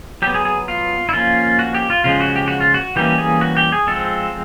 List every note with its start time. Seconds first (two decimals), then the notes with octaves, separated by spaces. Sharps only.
0.22 F#3 B3 G4
0.34 G#4
0.45 G#4
0.68 F4
1.09 E4
1.13 F3 A#3 C#4 F4
1.59 F#4
1.74 G4
1.90 F4
2.04 C#3 F3 G#3 F4
2.21 F#4
2.36 G4
2.48 F#4
2.60 F4
2.74 F#4
2.96 E3 G3 A#3 C#4 G4
3.18 G#4
3.41 F#4
3.57 G4
3.72 G#4
3.87 F3 G#3 C4 A4